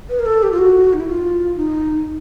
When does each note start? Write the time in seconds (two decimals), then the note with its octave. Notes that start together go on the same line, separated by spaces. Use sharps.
0.09 B4
0.19 A#4
0.26 A4
0.43 G4
0.52 F4
0.58 F#4
0.93 D#4
1.00 E4
1.08 F4
1.57 D#4